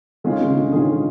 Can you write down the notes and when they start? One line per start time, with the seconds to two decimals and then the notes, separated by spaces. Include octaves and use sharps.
0.24 D#3 G#3 C#4 F4 G#4
0.41 C#3
0.56 D3
0.72 D#3 G#3 C#4 F4 G#4